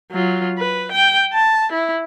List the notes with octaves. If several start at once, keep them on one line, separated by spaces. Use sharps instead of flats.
F#3 F4
B4
G5
A5
E4